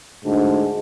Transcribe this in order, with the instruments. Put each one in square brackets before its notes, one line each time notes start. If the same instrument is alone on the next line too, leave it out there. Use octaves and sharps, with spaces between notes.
[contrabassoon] D2 [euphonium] G#2